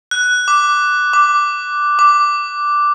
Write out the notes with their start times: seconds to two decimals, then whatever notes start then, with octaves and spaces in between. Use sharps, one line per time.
0.11 F#6
0.48 D6
1.13 D6
1.99 D6